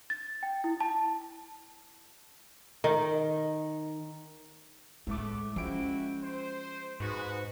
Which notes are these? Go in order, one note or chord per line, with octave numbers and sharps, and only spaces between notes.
A6
G5
E4
A5
D#3
A2 G#3 A3 B3 D6
F3 G#3 C#4 E4 F#4 G5 D7
C5
G#2 F#4 B4